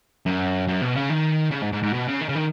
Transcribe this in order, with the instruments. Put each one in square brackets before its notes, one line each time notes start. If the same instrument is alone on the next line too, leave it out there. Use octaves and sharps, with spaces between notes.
[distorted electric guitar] F#2
F#2
B2
C#3
D#3
C#3
G#2
G#2
G#2
B2
C#3
D#3
C#3
D#3